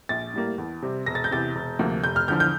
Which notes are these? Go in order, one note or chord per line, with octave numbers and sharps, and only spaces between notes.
A#1 A6
A2 G3 A#3
E2
C3 G3 C4
E1 A#6
A6
G6
E2 C3 A6
E1
D2 C3 F3 A#3
F1 G6
F6
E2 D3 F3 G6
G6